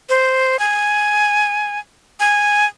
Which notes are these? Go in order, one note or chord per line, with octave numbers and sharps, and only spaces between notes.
C5
G#5
G#5